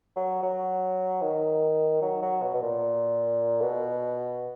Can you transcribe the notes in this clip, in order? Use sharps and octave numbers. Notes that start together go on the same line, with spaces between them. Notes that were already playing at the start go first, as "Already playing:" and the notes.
F#3
F#3
D#3
F#3
F#3
B2
B2
A#2
B2